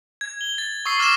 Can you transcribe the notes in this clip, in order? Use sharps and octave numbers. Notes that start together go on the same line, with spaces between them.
G#6
G7
A6
C#6 D#6 E6 C7
D6 F6 A6 A#6 E7